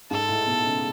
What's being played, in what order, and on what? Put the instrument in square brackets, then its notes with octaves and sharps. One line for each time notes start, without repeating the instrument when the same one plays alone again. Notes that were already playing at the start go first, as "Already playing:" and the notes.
[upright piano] G#2 [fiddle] A4
[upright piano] A2
B2
C#3